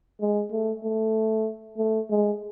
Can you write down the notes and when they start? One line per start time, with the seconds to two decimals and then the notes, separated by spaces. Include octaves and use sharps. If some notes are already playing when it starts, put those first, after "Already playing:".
0.21 G#3
0.51 A3
0.84 A3
1.78 A3
2.10 G#3